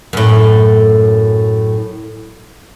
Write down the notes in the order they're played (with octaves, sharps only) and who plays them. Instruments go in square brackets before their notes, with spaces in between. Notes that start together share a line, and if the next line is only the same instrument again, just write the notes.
[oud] F#2 A2